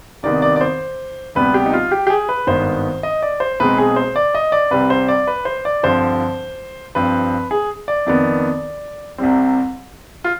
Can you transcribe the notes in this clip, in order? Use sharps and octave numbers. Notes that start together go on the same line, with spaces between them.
C2 C3 D#3 B3 D5
D5
D5
C5
D2 C3 G3 B3 B4
G4
D#4
F4
G4
G4
G#4
B4
G#1 G2 D#3 B3 C5
D#5
D5
C5
B1 B2 G#3 C4 B4
G#4
C5
D5
D#5
D5
C2 C3 G3 C4 B4
C5
D5
B4
C5
D5
G2 D3 F3 C4 C5
G2 F3 C4 B4
G#4
D5
F2 D#3 B3 D5
C2 C3 G3 C4
F4